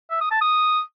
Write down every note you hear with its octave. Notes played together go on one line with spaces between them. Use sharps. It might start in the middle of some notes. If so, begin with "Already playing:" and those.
E5
D#6
A5
D#6